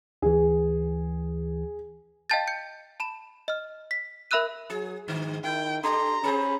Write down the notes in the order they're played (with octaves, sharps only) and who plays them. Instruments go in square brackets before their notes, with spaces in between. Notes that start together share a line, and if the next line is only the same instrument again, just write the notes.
[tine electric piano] D2 E3 [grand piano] G#4
[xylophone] D#5 F5 G5 A5 G6 A6
G6 C#7
A5 B5 E7
D#5 F6
B6
A#4 E5 B5 E6 F#6 D#7
[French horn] F#3 [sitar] G#4
[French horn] G#2 [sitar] D3
[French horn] D#3 [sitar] E4 [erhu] G5
[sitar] D4 G4 [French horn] A4 [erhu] A#5 [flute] C6
[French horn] C#4 [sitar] G#4 A#4 C5 [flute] B5